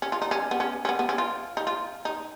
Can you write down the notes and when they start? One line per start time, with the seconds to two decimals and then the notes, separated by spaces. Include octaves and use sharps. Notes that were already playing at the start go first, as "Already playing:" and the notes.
0.02 C#4
0.12 F4
0.22 D#4
0.31 C#4
0.51 B3
0.60 C#4
0.85 C#4
0.89 B3
0.99 B3
1.09 C#4
1.18 F4
1.57 D#4
1.67 F4
2.05 D#4